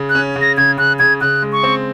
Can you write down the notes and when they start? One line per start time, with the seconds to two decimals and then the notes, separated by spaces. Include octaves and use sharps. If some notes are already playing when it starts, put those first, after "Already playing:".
Already playing: C#3
0.09 F#6
0.15 C#4
0.36 C#3
0.41 A#6
0.57 C#3 G#6
0.78 C#3 F#6
0.99 C#3 G#6
1.21 C#3 F#6
1.42 G#3
1.52 C#6
1.63 C4